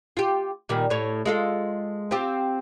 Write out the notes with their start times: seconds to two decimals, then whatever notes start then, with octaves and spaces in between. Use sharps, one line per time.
0.17 F4 G4
0.69 A#2 D#3 G3
0.90 A2 C#5
1.26 G#3 F4 A4
2.11 C4 F4 G4